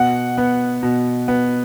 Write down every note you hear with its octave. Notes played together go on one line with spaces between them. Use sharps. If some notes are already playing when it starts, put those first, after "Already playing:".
Already playing: B2 F#5
B3
B2
B3